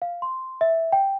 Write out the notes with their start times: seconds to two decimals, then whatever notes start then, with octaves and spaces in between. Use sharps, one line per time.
0.02 F5
0.22 C6
0.61 E5
0.92 G5